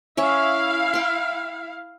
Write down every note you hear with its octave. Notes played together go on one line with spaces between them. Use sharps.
C#4 E4 C#5 E5 F5
G5 C6